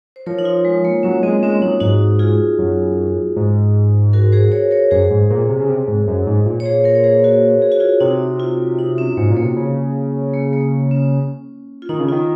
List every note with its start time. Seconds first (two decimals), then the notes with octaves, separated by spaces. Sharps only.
0.16 C5
0.26 F3 A#4 C#5
0.39 D#4
0.45 F4
0.65 G#3
0.85 A#3
1.03 F#3 C#4
1.22 G#3 C4
1.43 G#3 C#4
1.62 F#3 D#4
1.80 G#2 D#4 F#4
2.19 F4 G#4
2.59 F#2
3.36 G#2
4.13 F#4 A#4
4.32 G#4 C5
4.52 A#4 C#5
4.71 A#4 C#5
4.91 F#2 G#4 C5
5.10 G#2
5.30 A#2
5.49 C3
5.61 C#3
5.69 C3
5.88 G#2
6.07 F#2
6.27 G#2
6.46 A#2
6.60 C#5
6.66 G#4 C5
6.84 A#4 C#5
6.95 C#5
7.04 G#4 C5
7.24 F#4 A#4
7.62 G#4
7.72 F#4
7.80 F4 G#4
8.00 C3 D#4 F#4
8.40 F4
8.79 D#4
8.98 C#4
9.17 G#2 A#3
9.31 A#2
9.37 A#3
9.43 C3
9.56 C#3
10.34 A#3
10.53 A#3
10.91 C#4
11.82 F4
11.89 D#3 D#4
12.00 C#3
12.09 F4
12.12 D#3